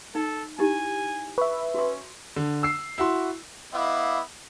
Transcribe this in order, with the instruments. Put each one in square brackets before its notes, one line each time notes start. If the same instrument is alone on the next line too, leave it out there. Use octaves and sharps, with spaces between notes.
[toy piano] D#4 [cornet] A4
[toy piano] D#4 E4 G4 [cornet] G#5
[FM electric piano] B4 E5 [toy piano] C#6
[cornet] C#4 [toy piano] F#4 C6
[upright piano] D3
E6 C7
E4 F#4 C6
[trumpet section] B3 E4 [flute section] D#5 F5 D6